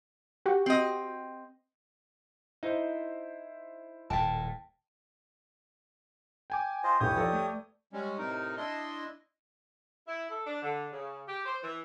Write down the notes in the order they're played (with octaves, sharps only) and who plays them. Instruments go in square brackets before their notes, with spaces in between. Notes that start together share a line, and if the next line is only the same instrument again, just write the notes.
[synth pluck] F#4 G4
[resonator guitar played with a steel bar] C4 D#5
[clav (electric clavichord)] D#4 [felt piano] E4 C5
[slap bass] D#1 A2 [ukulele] G5 A5
[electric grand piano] G5 G#5 D6
[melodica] F4 C5 D#5
[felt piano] B1 E2 [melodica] G4 C#5 D#6 [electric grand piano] G6
[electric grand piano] F3 D#4 A4 [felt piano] B4 D5
[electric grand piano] A3
[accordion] G3 G#3 C#4
A2 C3 D#4 A#4
D4 E4 D#5 C6
[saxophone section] E4
A4
D4
D3
C#3
G4
C5
E3